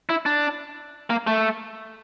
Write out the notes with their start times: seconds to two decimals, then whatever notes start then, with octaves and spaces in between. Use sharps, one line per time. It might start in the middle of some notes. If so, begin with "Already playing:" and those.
0.09 E4
0.26 D4
1.10 A#3
1.27 A3